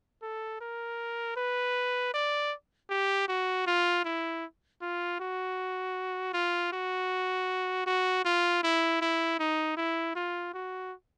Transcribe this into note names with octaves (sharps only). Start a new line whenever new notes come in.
A4
A#4
B4
D5
G4
F#4
F4
E4
F4
F#4
F4
F#4
F#4
F4
E4
E4
D#4
E4
F4
F#4